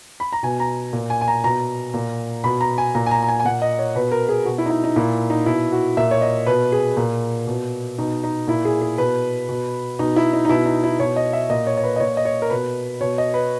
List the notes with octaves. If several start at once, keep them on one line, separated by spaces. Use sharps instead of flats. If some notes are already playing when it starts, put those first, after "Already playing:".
B5
A#5
B2 G#5
A#5
A#2
G#5
G#5
A#5
B2 A#5
A#2
B2 B5
A#5
G#5
A#2 A#5
G#5
A#5
A#5
G#5
G#5
A#2 F#5
D#5
C#5
B2 B4
A#4
G#4
B2 F#4
E4
D#4
E4
D#4
A#2 E4
D#4
B2 E4
F#4
A#2 E5
C#5
D#5
B2 B4
G#4
A#2
B2
B2 D#4
D#4
A#2 E4
G#4
G#4
B2 B4
B2
B2 D#4
E4
D#4
D#4
B2 E4
D#4
E4
B2 C#5
D#5
E5
A#2 D#5
C#5
C#5
B4
D#5
A#2 C#5
D#5
C#5
A#4
B2 B4
B2 C#5
D#5
B4